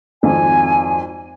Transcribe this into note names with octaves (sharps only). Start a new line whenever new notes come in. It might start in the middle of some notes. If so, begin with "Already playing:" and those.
G#1 F2 G#5